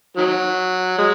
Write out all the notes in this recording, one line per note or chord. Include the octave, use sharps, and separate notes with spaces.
D#3 F#3
G#3